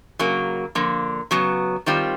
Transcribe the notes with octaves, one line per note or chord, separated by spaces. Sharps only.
C#3 F#3 A#3
D3 F3 A#3
C#3 F#3 B3
D#3 G3 C4 F4